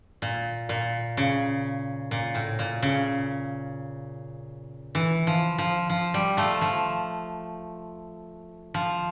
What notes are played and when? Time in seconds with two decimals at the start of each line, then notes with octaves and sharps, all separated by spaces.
0.22 A#2
0.69 A#2
1.17 C#3
2.11 A#2
2.34 A2
2.59 A#2
2.82 C#3
4.95 E3
5.27 F3
5.58 F3
5.90 F3
6.14 G3
6.37 F3 A3
6.61 F3
8.74 F3